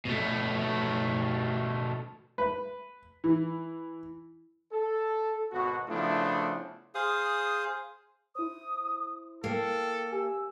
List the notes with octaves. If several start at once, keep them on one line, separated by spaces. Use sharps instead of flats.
B2 A3
B4
E3
A4
G#1 B2 B3 F#4
C#3 F3 A3 B3 D4 E4
G#4 C5 F5 D#6
E4 C5 D#6
A#3 A4 G5
G4 G#5 E6